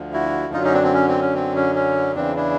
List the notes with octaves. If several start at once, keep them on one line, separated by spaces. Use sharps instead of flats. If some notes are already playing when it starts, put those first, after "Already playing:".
Already playing: D2 D3 F3
E4 F#4
F#2 D3 F#3 D#4 F4
C#4 D#4
C4 D4
C4
C#4
C4
C#4
C4
C#4
C#4
E2 C#3 E3 C4 D4
D4 E4